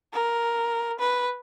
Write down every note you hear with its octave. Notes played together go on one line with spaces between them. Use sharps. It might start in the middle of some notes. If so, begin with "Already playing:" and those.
A#4
B4